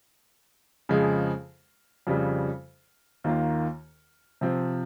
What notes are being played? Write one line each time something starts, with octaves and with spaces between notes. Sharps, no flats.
F2 C#3 F3 G#3
F2 C#3 G3
D#2 D#3 A#3 F4
C3 F3 C4